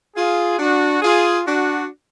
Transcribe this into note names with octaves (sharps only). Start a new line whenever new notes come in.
F4 G#4
D4 F#4
F4 G#4
D4 F#4